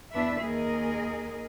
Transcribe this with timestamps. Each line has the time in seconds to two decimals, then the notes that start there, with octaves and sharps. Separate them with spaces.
0.12 E2 D4 B4 E5
0.42 D#2 G#4 A#4 D#5